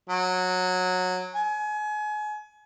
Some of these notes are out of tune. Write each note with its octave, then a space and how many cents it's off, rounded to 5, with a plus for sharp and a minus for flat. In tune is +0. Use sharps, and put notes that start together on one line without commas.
F#3 -15
G#5 +30